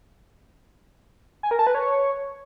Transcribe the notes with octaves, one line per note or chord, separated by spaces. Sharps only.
G#5
A#4
A5
B4
C#5